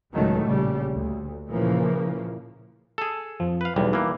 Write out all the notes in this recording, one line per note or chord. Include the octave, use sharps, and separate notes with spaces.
C#2 A2 D#3 F#3 G#3 A3
A#1 C#3 G3
D2
A#2 C#3 E3 F3 A#3
G#4 A4
F2 F3
B4 F5
B1 E2 B2 G3
E3 A#3